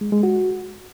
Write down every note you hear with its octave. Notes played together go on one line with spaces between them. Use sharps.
G#3
G#3
F#4